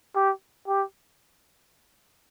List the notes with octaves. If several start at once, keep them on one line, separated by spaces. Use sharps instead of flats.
G4
G4